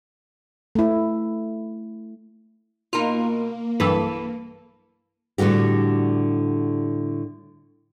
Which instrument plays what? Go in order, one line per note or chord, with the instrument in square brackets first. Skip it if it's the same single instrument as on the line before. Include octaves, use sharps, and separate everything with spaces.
[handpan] A3 E4
[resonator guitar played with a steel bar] B2 A#4 [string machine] A#3 [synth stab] D#4 F4
[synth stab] B1 G2 E3 [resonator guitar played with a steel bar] A4 B4
[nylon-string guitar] A2 D3 G3 F#4 G4